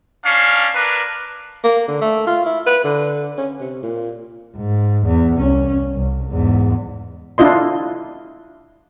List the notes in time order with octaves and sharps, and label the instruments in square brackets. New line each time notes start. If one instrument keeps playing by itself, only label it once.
[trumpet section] C#4 D4 F5
D4 A#4 B4
[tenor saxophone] A#3
D3
A3
F4
E4
B4
D3
C#4
C3
A#2
[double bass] G#2
E2
C2 C#4
C2
E2 G#2
[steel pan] D4 E4 F4 D#5 C6